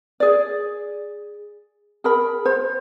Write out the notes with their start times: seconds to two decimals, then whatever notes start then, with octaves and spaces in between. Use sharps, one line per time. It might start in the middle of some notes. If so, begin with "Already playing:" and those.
0.20 G#4 D5
2.04 G#4 A#4 B5
2.45 C5